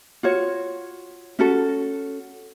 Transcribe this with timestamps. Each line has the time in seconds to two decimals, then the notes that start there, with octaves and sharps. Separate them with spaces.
0.23 F4 F#4 C#5
1.39 C#4 F#4 A4